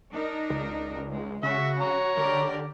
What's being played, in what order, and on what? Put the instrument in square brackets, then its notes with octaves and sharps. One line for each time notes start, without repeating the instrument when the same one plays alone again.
[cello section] D4 D#4 A#4
[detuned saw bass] C#2
[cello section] G#3
[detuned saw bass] C#3 [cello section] F#4 [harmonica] E5
[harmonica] C#5 A#5
[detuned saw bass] D3 [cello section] G4 A#4 D5